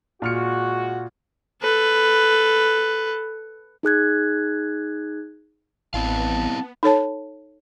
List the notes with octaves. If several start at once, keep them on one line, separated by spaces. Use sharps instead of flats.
A#2 G#3 F#4 F6 C#7
A4 B4
D#4 G#4 F#6 G#6
A1 B3 C4 E4 F5 A5
D#4 A4 C#5 A5